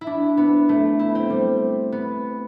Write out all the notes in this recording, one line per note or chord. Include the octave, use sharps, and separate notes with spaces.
E4
D4
B3
A3
E4
C4
G3
B3